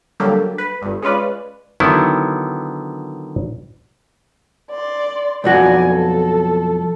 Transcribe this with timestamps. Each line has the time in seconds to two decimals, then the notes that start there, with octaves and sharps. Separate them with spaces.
0.20 D3 F#3 G3 A#3 G4 A4
0.58 B4
0.82 G1 G2
1.02 G#3 C#4 F4 B4 D5
1.80 D3 D#3 F#3 B3 E4
4.71 D5 C6
5.44 B1 F2 F#4 D5 G#5
5.89 A4